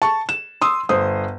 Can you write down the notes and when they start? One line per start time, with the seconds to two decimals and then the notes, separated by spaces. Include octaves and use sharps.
0.02 A5 C#6
0.29 E7
0.62 C6 D#6 E6
0.89 G1 C5 D#6